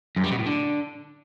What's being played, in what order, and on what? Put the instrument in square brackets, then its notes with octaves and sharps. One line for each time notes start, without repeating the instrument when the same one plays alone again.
[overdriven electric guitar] F#2
G3
B2
A2
D3